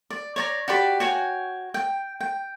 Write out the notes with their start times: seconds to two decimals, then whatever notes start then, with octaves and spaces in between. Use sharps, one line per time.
0.10 D5
0.36 C#5 D5 A#5
0.68 F#4 G4 D5 B5
1.00 F#4 C#5 G5 G#5
1.74 G5
2.21 G5